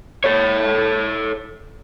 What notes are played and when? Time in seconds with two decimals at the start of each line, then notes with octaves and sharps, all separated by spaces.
0.24 A4 C#5